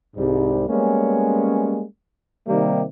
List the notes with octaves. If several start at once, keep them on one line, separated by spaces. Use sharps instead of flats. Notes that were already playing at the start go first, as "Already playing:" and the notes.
C2 G#2 G3
G3 G#3 A#3 B3 C#4
C3 D#3 G3 A#3 D#4 G4